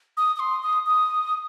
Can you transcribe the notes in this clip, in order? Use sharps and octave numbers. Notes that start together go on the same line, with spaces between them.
D#6
D#6
C6
D#6
D#6